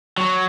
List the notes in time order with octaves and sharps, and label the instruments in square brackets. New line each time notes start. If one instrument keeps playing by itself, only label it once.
[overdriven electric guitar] F#3